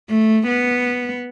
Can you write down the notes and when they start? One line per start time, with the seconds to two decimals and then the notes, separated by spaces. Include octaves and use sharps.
0.10 A3
0.47 B3